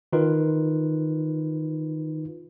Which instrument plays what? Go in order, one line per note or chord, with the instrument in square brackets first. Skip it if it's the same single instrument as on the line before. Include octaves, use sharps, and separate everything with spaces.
[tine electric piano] D#3 D#4 F4 B4